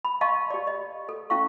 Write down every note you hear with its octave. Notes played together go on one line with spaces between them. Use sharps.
B5
D#5 F5 A5 C6 C#6
G4 D5
D#5
A4
C#4 E4 F5 C#6